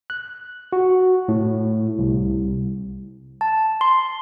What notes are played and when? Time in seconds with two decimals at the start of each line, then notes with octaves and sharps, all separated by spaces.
0.10 F#6
0.73 F#4
1.28 A2
1.98 C2
3.41 A5
3.81 C6